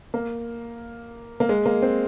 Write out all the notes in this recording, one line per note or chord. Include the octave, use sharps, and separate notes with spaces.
A#3
A#3
G#3
A#3
C4